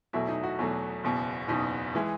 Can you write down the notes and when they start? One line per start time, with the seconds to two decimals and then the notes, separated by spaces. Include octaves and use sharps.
0.13 E2 B2 F#3 A3 E4
0.28 D#4
0.44 F#4
0.59 E2 B2 F#3 A3
1.04 F#1 E2 B2
1.48 F#1 E2 B2 D#4
1.95 E3 G#3